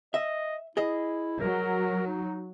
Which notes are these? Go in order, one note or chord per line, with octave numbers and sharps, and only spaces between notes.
D#5 E5
E4 G#4 D#5
F#3 A#4
D#4